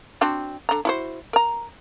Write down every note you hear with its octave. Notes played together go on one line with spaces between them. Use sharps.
C4 D4 F#4
D3 A#5
E4 F#4 C5
A#4 A#5